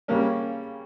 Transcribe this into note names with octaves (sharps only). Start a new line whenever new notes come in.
C#3 G3 A#3 C#4